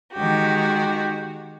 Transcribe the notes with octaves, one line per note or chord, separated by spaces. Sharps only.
D#3 G#3 F#4 G4